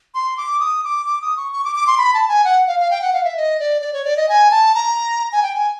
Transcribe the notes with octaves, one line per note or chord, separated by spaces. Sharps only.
C6
D6
D#6
D6
D6
D#6
C#6
C#6
D6
D6
C6
B5
A5
G#5
F#5
F5
F5
G5
F#5
F5
E5
D#5
D5
D5
C#5
D5
D#5
G#5
A5
A#5
G#5
G5
G#5